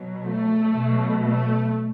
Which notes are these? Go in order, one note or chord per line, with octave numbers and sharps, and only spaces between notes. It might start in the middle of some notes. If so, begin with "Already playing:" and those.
Already playing: B2 F#3
A3
B2 F#3
A3